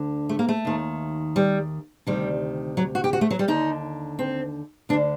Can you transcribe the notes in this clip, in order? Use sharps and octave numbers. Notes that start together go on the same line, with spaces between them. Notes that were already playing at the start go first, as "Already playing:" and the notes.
Already playing: D2 D3
A3
A#3
A3
D#2 D#3
G3
D2 C3 D#3 G3
F#3
F#4
G4
F#4
A3
F#3
G3
D#2 D3 D#4
C4
D2 D3 D4